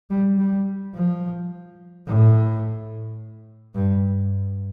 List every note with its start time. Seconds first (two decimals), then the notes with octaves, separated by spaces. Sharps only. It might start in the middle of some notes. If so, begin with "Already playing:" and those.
0.10 G3
0.38 G3
0.94 F3
2.07 A2
3.75 G2